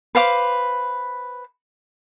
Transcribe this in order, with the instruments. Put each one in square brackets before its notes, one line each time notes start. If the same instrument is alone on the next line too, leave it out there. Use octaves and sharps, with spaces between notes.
[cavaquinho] B4 C5 F5 D6